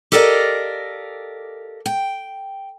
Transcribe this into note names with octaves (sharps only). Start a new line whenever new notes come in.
G4 A4 A#4 D5 D#5 F5
G5